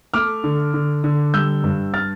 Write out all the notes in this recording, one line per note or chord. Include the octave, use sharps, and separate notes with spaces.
A3 D6 F6
D3
D3
D3
G3 E6 G6
G2
F6 A6